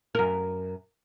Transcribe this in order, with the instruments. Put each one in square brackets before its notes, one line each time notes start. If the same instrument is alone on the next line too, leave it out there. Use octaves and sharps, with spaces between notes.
[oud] F#2 A#4